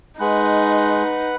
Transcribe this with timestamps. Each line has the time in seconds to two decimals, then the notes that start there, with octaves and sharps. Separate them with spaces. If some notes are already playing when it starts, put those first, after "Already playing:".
0.20 G#3 D#4 B4 F#5